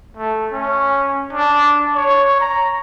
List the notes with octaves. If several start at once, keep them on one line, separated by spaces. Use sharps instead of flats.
A3
C#4
D4
C#5
A#5